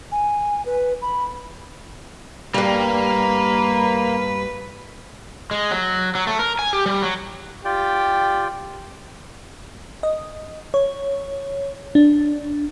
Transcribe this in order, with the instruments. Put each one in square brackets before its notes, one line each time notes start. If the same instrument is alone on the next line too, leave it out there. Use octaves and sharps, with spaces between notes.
[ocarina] G#5
B4
B5
[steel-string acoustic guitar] G2 G3 [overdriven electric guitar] A#3 [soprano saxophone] B4
[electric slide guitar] G#3
F#3
F#3
A3
A#4
G#5
G4
G3
F#3
[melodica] F4 D5 G5 [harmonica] G4
[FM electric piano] D#5
C#5
D4